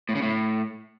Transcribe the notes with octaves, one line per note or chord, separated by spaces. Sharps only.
A2
C#3
A2